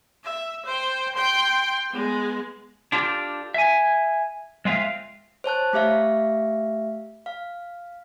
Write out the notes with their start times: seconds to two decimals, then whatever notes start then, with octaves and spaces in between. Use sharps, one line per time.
0.24 E5
0.65 C5 G5
1.15 G5 C6
1.90 G#3 B3
2.92 D4 F4 G4 A4
3.54 E5 G#5
4.65 G#3 C4 F4 E5 F5
5.44 C5 C#5 A5 F#6
5.73 A3 G4 E5 F5
7.26 F5